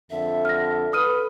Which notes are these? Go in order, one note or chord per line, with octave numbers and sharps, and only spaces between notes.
F2 D3 A4 E5
F6 A#6
A4 B4 D#6 F6 D#7